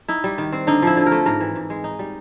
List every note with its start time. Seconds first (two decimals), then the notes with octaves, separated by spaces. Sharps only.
0.08 D#4 E4
0.24 G3
0.38 D#3
0.52 C4
0.67 D3 D#4
0.82 F3 E4
0.97 D3
1.06 A#4
1.11 A3
1.26 G#2 A#4
1.41 E3
1.56 G#2
1.70 G#3
1.84 D#4
1.99 G3